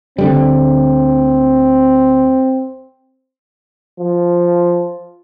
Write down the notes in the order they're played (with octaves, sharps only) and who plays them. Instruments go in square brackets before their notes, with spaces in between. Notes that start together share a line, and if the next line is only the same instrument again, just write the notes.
[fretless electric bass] D2 D3 G3 [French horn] C4
[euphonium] F3